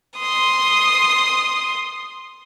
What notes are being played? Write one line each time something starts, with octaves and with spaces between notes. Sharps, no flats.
C6 D#6